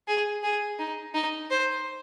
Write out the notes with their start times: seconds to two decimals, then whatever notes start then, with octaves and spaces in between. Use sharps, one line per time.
0.08 G#4
0.43 G#4
0.79 D#4
1.14 D#4
1.51 C5